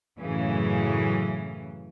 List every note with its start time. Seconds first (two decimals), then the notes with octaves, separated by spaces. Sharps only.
0.19 F#2 A2 C#3 E3